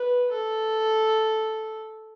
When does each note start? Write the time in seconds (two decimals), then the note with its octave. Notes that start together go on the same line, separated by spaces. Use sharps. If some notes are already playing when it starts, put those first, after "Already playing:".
Already playing: B4
0.32 A4